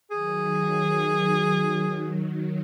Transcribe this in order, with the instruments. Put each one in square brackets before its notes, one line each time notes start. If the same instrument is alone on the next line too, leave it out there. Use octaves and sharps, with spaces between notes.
[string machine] D#3 F#3 [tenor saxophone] G#4